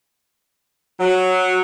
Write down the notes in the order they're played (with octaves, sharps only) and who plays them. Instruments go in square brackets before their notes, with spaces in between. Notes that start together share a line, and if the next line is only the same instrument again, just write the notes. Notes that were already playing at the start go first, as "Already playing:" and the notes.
[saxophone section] F#3